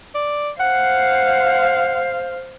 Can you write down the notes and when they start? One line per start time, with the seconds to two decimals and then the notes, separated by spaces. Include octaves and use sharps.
0.14 D5
0.60 C5 F5 F#5